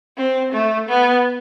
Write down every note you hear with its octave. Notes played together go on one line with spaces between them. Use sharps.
C4
A3
B3